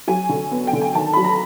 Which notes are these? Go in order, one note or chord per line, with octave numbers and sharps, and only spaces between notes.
F#3 G#5
D3
B3
G5
D3
G#5
D#3 A5
F#3 B5
A#5